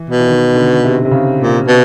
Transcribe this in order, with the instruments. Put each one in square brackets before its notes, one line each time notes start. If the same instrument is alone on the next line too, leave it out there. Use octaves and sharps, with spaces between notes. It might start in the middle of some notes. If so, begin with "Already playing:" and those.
Already playing: [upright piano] E3
[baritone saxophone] B2
[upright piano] E3
D#3
D3
C3
C3
C#3
[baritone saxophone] A#2
B2